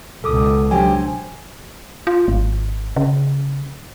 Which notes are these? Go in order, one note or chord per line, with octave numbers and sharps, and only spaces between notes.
C#2 B2 A4 D6 D#6
F#3 D4 G4 C5 G#5
F4
G#1
C#3